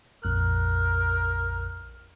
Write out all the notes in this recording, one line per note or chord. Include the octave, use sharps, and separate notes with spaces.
A#1 F2 A#4 F#6